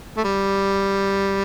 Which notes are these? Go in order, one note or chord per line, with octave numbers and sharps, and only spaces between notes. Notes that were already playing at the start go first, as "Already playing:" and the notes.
A3
G3